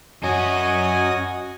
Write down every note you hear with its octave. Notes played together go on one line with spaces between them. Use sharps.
F#2 C#4 F#4 D#5 G#5